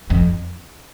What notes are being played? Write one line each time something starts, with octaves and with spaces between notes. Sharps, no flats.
F2